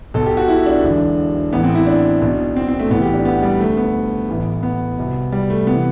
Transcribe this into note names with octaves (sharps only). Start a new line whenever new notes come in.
B1 B2 A4
G4
F#4
E4
D4
E1 E2 D3
A1 A2 E3 B3
C4
E4
D4
B1 B2
C4
C4
A3
B1 A2 E3 B3
G4
D4
B3
G3
D2 D3 A3
B3
A1 A2 E3
B3
C2 B2
G3
A3
C3 E3 B3